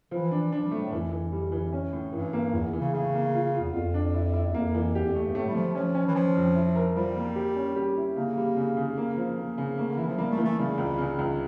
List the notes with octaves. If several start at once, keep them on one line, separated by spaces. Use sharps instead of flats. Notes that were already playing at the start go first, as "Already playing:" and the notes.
E3 F3
D4
F3 D4
G3
A3
A2
F2 E3
E3
G3
E3
C#4
A2
G2 E3
A#3
E2 E3
E3
C#3
A2 C#3
A#3
F4
F4
E2
F2 F4
D4
E4
E4
E2
F2 A#3
E3
E2 G4
F2
E2 A3
G2
A2 A3
G3
F3 A3
F3 C#4
C#4
E3
F3 C#4
F2
E4
A#4
F3 G3
A#3
G4
C#4
G4
E4
C#3 A#3
G3
C#3
C#3
A#3
F3
A#3
C#3
A3 A#3
D3
E3 E4
F3
G3 A#3
A3
E3
A3
C#3 G3
C#2
C#3
C#2